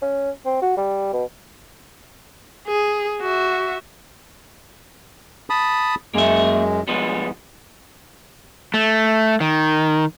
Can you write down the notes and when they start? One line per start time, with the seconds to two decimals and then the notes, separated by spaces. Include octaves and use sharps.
0.02 C#4
0.45 C4
0.62 F#4
0.77 G3
1.13 B2
2.67 G#4
3.21 F#4 E5
5.50 A5 B5 D#6
6.14 F#2 G#3 A#3 E5
6.88 B1 F3 G3 G#3 B3
8.74 A3
9.41 D#3